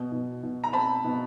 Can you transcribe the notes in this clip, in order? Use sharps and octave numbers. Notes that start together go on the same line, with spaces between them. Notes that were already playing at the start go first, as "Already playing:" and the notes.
Already playing: B2
B2
B2
A#5
C4 A5 B5
B2